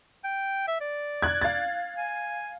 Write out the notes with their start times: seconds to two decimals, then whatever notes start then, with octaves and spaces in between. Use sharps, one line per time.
0.24 G5
0.68 E5
0.81 D5
1.22 F#6 G#6
1.41 F5 A6
1.97 G#5